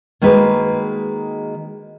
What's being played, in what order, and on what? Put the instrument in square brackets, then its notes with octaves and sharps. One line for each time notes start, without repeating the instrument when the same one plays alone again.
[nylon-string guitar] D#3 G#3 A#3 F#4 G#4 B4